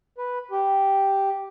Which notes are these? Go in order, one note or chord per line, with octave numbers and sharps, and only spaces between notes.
B4
G4